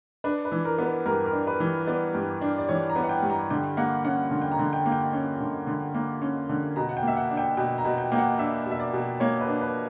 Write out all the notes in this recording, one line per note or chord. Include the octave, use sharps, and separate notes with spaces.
D4 B4
B4
E3
A#4
B3
B4
G2 A#4
A#4
D4
B4
E3
B3 D5
G2
D4
D5
E3 C#5
A#5
B3
F#5
G5
G2
A#5
D3 G5
A#3 F#5
C#4 F#5
D3
G5
A#5
D3
G5
A#3
G5
C#4
D3
D3
A#3
C#4
D3
B2 A#5
F#5
G5
A#3 E5
F#5
D4
G5
B2 G5
A#5
B2
G5
A#3 G5
F#5
D4 E5
B2
E5
D5
B2
A#3 C#5
B4
D4
B4